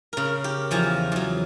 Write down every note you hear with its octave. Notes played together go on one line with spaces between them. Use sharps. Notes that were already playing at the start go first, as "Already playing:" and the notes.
C#3 A#4
G4
E2 F3 G#5 A#5
E2 F#3